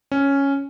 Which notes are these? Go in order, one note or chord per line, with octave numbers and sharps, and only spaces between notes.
C#4